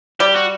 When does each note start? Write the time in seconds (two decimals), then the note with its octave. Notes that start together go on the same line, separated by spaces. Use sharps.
0.20 G3 G4
0.35 F#4